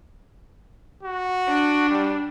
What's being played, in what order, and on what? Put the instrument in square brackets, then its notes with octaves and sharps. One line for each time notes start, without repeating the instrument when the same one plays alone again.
[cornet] F#4
[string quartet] D4
[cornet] G3